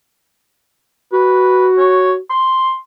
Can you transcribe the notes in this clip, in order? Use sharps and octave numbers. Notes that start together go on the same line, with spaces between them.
F#4 B4
C#5
C6